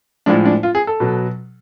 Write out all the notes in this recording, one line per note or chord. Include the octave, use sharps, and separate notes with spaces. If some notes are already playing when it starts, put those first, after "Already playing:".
A2 F3 G#3 D4
D4
F4
G#4
A4
B2 F#3